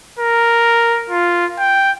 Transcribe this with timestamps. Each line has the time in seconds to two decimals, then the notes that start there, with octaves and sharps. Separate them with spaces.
0.19 A#4
1.10 F4
1.59 G5